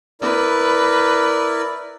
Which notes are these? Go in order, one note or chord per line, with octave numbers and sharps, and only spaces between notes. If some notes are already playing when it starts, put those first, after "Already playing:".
E4 A#4 B4 D5